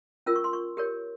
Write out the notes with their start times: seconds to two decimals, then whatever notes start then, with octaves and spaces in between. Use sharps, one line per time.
0.26 C#4 F4 A#4 E6
0.36 C#6
0.44 C6
0.53 C#6
0.77 G4 A#4 C#5